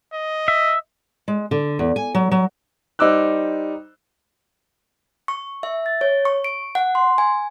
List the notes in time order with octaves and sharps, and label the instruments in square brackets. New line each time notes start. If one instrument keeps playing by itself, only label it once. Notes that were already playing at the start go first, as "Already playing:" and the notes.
[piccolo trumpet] D#5
[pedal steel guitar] E5
[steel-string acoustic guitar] G#3
D3
E2
G#5
F#3
F#3
[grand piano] G3 D#4 C5 D6 E6 F#6
[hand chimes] C#6
E5
A6
C#5
C#6
D7
F#5
C6
G#5